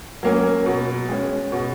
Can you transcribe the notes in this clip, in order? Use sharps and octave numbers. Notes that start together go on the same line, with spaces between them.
F#3 A#3 C#4
B2
G#3 C#4
B2